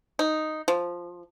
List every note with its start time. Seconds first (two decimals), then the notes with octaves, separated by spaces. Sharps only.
0.19 D#4
0.68 F3